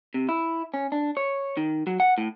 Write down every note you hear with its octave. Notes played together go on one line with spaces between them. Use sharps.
C3
E4
C#4
D4
C#5
D#3
F#3
F#5
A2